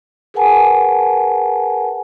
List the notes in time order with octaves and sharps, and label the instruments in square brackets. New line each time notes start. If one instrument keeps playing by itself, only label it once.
[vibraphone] G#4 A#4 B4 F#5 G#5 A5